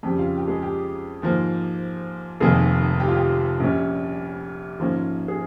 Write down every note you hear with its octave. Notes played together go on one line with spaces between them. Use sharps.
F2 C#3 G3 G4 G5
F4 F5
G4
G#3 G#4
G4
G#2 F3 A#3
F1 F2 D#3 G#3 A#3 G#4
G4
F4
G4
A#1 A#2 G3 C#4
G#2 F3 A#3 C#4
G#4